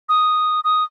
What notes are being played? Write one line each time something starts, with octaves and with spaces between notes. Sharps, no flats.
D#6
D#6